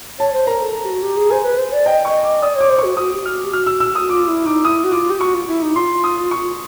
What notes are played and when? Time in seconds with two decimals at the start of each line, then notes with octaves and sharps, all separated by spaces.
0.19 C#5 A5
0.33 C5
0.47 A#4 A#5
0.61 A4
0.84 G4
0.89 F#4
1.03 G4
1.16 G#4
1.30 C5 G#5
1.44 B4
1.58 C5
1.73 D5
1.86 D#5 G5
2.05 D#5 C#6
2.23 D6
2.42 D5 D#6
2.56 C#5 D6
2.69 C5
2.78 C#6
2.84 F#4
2.97 F#4 D#6
3.13 G4
3.25 F#4 F6
3.45 G4
3.53 F#4 F6
3.66 E6
3.80 E6
3.95 D#6
4.09 F4 D6
4.28 E4
4.46 D#4 D6
4.65 E4 D#6
4.84 F#4
4.92 F4 D6
5.10 G4
5.20 F#4 C#6
5.34 F4
5.47 E4
5.62 D#4
5.75 F4 C6
6.04 D#6
6.31 C#6